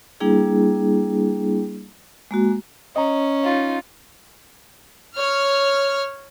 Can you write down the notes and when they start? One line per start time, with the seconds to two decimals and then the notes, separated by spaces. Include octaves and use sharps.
0.20 G3 A#3 D4 E4 G#4
2.31 G#3 A#3 F#4
2.96 C#4 D#5 A#5
3.44 D#4 F4
5.15 C#5 F6